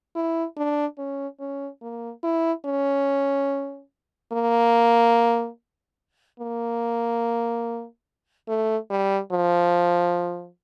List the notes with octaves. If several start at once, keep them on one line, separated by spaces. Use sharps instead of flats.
E4
D4
C#4
C#4
A#3
E4
C#4
A#3
A#3
A3
G3
F3